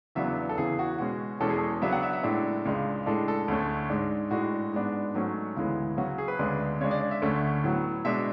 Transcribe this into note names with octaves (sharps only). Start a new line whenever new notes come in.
E2 C#3 F#3 B3 D4 E5
A4
E2 C#3 E3 G#4
F#4
B2 G#3 C#4 F#4
E2 B2 G#3 C#4 A4
G#4
A4
C#3 F#3 B3 D4 E5
F#5
E5
E5
A2 G#3 D4
C#2 C#3 G#3 D4
A2 G#3 D4 A4
A4
D2 D3 A3 C#4
G#2 G#3 D4
A2 G#3 D4 F#4
G#2 G#3 B3 D4
G#2 F#3 A3 C#4
D2 C#3 E3 G#3 B3
C#3 F#3 C#4 F#4
G#4
B4
D2 C#3 G#3 D4
C#3 G#3 D4 C#5
D5
D5
E5
D2 D3 A3 C#4
A2 F#3 B3
B2 G#3 D4 E5